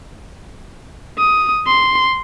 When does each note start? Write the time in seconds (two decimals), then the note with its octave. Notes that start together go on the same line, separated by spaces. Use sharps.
1.18 D#6
1.67 C6